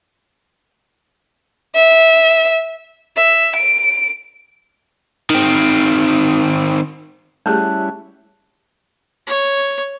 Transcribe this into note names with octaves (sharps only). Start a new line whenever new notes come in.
E5
E5
D7
D#3 C4
G3 A3 C#4 E4 G4 G#4 A5 F#6
C#5